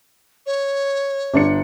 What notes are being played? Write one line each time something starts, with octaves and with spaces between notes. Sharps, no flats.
C#5
G1 D4 C#7